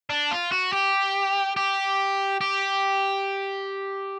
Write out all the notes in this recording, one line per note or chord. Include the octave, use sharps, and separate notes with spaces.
D4
F4
F#4
G4
G4
G4